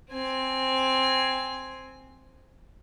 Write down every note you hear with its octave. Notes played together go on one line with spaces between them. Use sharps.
C4 G#5